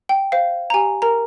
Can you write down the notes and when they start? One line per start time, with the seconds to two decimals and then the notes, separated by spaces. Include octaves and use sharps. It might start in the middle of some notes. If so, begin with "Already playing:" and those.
0.09 G5
0.32 C5 F5
0.70 A#5
0.74 G4 G#5
1.02 A#4 A#5